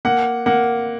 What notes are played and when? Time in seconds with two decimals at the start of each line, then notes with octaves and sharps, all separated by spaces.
0.05 A#3 F#5
0.46 A#3 F#5